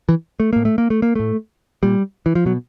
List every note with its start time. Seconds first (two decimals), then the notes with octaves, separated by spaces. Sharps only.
0.09 E3
0.40 A3
0.53 A2 A#3
0.65 A3
0.78 A#3
0.90 A3
1.02 A#3
1.15 A2 A3
1.83 A#2 G3
2.26 E3
2.35 F3
2.45 B2 F#3